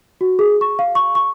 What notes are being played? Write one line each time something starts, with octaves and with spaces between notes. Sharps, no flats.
F#4
G#4
C#6
F5
C#6
C#6